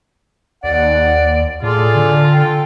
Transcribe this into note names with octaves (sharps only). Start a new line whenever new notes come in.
D#2 D5 F#5
A2 F4 G#4 A4 D5
D3
A4 G5